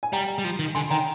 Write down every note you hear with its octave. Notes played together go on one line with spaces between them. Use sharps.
G#5
G3 G5 A#5
G3
F3
D#3
D3 G#5 C6
D#3 G5 A#5